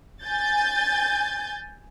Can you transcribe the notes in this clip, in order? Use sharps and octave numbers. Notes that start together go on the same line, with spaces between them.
G#5 G6 A6